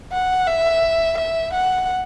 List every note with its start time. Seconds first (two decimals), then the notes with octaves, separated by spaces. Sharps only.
0.12 F#5
0.47 E5
1.18 E5
1.53 F#5